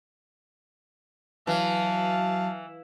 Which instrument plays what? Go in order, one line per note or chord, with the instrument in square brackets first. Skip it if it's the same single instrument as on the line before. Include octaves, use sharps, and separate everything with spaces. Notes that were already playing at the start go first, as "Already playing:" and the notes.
[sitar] E3 [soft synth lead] F#3 [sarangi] F5 [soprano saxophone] A5